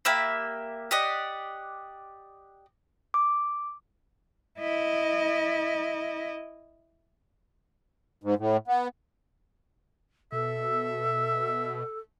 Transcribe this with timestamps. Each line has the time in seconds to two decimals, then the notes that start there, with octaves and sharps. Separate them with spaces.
0.05 A#3 G4 E5 B5
0.91 G4 D5 D#5 F#5
3.14 D6
4.59 E4 D#5
8.24 G#2
8.38 A2
8.68 B3
10.32 B2 A4 E5